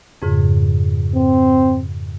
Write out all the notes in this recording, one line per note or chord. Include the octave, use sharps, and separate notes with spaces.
F2 G#2 C#3
C4